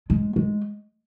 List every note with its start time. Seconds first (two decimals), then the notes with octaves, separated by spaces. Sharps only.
0.10 G#3
0.36 G#3